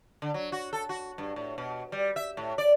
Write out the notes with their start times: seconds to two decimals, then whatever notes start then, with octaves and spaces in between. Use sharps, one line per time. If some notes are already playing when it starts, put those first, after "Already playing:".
0.22 D3
0.34 F#3
0.52 F#4
0.73 A4
0.89 F#4
1.18 G2
1.36 A2
1.58 B2
1.92 G3
2.16 E5
2.37 A2
2.58 D5